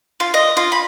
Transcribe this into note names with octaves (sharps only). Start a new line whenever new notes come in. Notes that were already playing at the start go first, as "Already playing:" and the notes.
F4
D#5
F4
B5